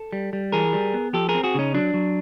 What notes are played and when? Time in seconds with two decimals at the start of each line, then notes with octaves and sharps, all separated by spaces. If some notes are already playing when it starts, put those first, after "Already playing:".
Already playing: A4
0.13 G3
0.33 G3
0.52 E3 G#4 A#4
0.73 G3
0.94 B3
1.13 F3 G4 A4
1.29 G#4 A#4
1.34 C4
1.43 F#4 G#4
1.55 C#3 C#4 D#4
1.74 F#3 D4
1.94 F#3